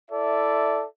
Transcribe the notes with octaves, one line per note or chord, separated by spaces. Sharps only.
E4 A4 D5 E5